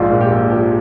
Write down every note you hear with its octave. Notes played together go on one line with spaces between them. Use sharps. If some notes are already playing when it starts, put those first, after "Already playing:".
Already playing: A#1 G#2 F4
A#2
G4
A#1
F3 G4